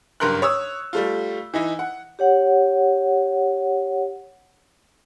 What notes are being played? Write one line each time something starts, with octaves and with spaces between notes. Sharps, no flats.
F#1 G2 A#4 C6 F#6
C#5 D#6 E6
G3 A3 F4
E3 D#4 E4
F#5
G4 C#5 F#5